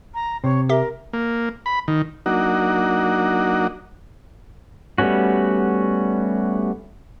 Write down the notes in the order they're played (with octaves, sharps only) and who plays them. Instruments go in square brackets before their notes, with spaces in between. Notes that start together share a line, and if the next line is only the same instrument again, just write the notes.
[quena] A#5
[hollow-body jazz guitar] C3 [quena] C#5
[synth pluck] G4 E5 [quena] A#4
[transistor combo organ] A#3
B5
D#3
F#3 A#3 D4 D#4 F#4
[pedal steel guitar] G3 A3 B3 C#4 F#4